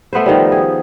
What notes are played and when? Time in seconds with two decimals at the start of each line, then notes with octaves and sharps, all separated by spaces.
0.13 A3 B3 B4 C5
0.26 D#3 F3 G3
0.52 G#4